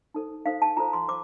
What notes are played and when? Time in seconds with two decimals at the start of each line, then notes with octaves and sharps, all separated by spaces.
0.14 D#4 A4 C5
0.46 D#4 A4 C5 F5
0.62 A5
0.77 F4 A4 C5 A#5
0.93 C6
1.08 C5 D6